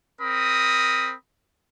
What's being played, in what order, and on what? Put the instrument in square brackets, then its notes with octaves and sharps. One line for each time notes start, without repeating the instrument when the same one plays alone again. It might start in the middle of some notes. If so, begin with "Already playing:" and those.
[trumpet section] C4 A#4 B5 D#6